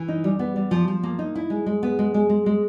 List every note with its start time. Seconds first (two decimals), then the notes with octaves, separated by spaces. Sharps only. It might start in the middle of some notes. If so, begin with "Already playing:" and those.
Already playing: E3
0.08 D#4
0.24 G3
0.39 B3
0.56 G3
0.71 F3
0.88 F3
1.03 A#3
1.19 D#4
1.35 E4
1.50 G#3
1.66 G#3
1.83 B3
1.99 G#3
2.14 G#3
2.29 G#3
2.46 G#3